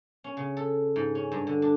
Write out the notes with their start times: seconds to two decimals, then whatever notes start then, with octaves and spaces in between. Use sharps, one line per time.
0.24 C#4
0.37 C#3
0.57 A4
0.96 G#2
1.15 C#4
1.32 G2
1.47 D3
1.62 D4